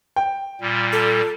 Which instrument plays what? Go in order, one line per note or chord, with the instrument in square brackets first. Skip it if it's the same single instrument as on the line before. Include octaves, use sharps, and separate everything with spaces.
[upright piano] G5
[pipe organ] A#2 G3
[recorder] A4